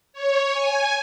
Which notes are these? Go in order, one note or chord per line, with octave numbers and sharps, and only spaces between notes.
C#5
G#5